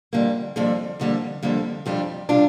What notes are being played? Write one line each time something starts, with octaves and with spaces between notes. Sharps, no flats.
F2 D3 G3 A#3
F2 D3 G3 A#3
F2 D3 G3 A#3
F2 D3 G3 A#3
F2 C3 G3 D4 F4
C3 G3 D4 F4